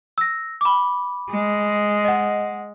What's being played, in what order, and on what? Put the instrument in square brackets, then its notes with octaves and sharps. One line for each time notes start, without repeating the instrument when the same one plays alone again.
[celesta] E6 A#6
B5 D6
[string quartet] G#3
[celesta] D#5 F#5